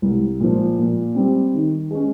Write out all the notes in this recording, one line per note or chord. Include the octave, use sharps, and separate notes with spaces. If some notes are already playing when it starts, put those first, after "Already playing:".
C2
A#2 F3
A#2
G3 C4
D#3
G#3 C#4